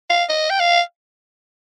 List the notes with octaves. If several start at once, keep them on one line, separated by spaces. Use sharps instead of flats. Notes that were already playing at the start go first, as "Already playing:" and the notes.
F5
D#5
G5
F5